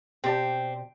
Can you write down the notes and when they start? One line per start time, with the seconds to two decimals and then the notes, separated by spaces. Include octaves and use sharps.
0.24 B2 C4 G4 D5 A5